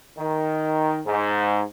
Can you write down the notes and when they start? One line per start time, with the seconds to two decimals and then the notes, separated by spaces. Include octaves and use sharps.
0.18 D#3
1.07 G#2